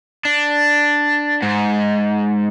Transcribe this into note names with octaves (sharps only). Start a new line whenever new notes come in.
D4
G#2